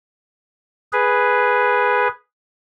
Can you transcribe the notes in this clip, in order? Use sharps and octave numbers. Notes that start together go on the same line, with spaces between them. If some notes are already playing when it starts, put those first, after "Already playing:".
G#4 B4